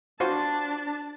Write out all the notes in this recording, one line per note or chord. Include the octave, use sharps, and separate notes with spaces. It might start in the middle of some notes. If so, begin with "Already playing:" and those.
D4 F4 F#4 C5 A5